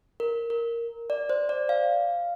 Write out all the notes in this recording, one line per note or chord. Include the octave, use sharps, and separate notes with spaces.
A#4
A#4
D5
C5
D5
F5